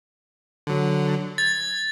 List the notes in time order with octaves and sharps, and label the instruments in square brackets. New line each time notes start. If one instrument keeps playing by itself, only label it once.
[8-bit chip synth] D3 F#3
[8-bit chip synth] G#6 [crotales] A6